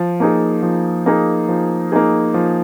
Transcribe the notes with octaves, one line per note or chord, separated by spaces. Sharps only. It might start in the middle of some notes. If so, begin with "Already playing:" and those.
Already playing: F3
A#3 D#4 G#4
F3
A#3 D#4 G#4
F3
A#3 D#4 G#4
F3